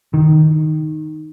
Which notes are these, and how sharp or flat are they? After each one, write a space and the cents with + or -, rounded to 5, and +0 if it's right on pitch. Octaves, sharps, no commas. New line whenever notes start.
D#3 -5